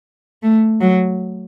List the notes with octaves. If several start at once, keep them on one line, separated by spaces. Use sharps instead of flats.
A3
F#3